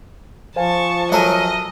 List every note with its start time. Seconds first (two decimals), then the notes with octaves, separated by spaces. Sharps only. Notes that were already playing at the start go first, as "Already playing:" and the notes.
0.56 F3 C5 F5 G#5 A5 C#6
1.12 F#3 A4 A#4 D#5 E5 G#5